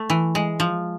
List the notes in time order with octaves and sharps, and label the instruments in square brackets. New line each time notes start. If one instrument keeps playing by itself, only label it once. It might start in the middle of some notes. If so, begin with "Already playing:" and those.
Already playing: [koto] A3
E3
G#3
F3